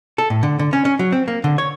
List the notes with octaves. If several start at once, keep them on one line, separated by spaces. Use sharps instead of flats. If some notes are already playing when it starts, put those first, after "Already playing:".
A4
A2
D3
D3
C#4
C#4
F#3
C4
A#3
D3
C#5